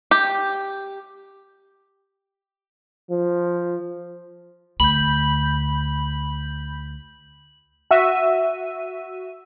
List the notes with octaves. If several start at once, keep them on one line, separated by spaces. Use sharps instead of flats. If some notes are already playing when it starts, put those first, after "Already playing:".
G4
F3
D2 B5 G6 F#7
F#4 E5 E6 D#7